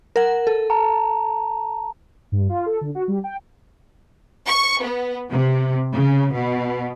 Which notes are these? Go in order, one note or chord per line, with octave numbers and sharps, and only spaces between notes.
A#4 F#5
A4
A5 A#5
G2
F4
A4
D3
F#4
G3
G5
C#6
B3
C3
C#3
B2